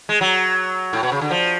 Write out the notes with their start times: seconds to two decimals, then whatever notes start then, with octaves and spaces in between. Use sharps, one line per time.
0.09 G#3
0.21 F#3
0.93 A2
1.03 B2
1.12 C#3
1.21 D3
1.31 F3